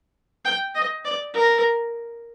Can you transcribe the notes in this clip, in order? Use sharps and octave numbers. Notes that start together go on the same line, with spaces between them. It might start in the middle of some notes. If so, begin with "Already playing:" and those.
G5
D#5
D5
A#4